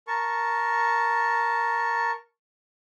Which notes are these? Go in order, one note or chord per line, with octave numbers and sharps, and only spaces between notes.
A#4 A5 C#6